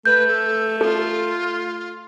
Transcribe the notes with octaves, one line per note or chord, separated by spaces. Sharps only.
A3 B4 G6
A4
F4 A4